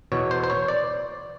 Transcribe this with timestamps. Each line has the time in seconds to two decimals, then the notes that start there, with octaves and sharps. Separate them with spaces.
0.12 E2 B2 C#5
0.31 C5
0.44 C5
0.50 C#5
0.68 D5